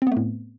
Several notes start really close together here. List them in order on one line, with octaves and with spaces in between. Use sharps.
C4 B3 A3 A2